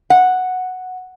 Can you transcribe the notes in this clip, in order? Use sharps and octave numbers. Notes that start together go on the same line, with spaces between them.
F#5